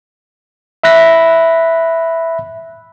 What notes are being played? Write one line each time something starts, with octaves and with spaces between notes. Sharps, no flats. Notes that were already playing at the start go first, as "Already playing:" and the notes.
E5 B5 F#6 A#6 B6